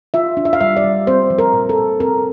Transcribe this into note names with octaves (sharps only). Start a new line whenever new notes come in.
F4 E5
D4
E5
F5
G3 E5
D5
G3
C4 C5
F3
A#4
A#2
A4
A#2
C4 A#4